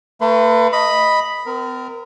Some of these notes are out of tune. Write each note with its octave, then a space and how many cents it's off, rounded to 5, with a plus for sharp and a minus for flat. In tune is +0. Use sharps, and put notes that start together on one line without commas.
A3 +40 B4 +0 C6 -25
D#5 +0 B5 +0
C4 -45 A#4 +0